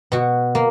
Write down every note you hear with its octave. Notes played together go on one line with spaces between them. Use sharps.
B2 F#4
A#3